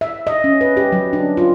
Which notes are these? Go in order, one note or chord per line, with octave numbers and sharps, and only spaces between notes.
E5
D#5
C#4
B4
G4
F#3
D4
F4